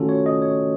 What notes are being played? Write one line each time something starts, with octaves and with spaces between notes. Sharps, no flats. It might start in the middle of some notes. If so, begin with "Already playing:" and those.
Already playing: D#3 A3 C#4 F4 F#4 A4
C#5
D#5
C#5